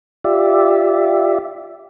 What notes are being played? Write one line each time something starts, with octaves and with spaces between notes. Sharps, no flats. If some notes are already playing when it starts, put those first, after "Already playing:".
F4 G4 D5 E5